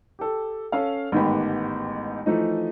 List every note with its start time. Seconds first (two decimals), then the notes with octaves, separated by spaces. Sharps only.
0.19 G4 A4
0.72 C#4 A4 F5
1.12 A1 G#2 D#3 B3 G4 B5
2.26 E3 F3 A3 D#4